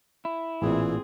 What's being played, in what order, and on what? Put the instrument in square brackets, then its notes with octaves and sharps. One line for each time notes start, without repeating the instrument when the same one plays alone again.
[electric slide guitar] E4
[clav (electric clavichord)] A1 A#2 [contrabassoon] E3 [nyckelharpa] C4 G#4